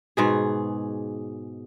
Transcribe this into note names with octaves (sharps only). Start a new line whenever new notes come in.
G#2 B2 G#4